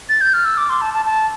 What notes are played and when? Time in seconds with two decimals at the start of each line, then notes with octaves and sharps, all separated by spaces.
0.09 A6
0.21 G6
0.34 F6
0.45 E6
0.57 D6
0.69 C6
0.81 A5
0.94 A5
1.06 A5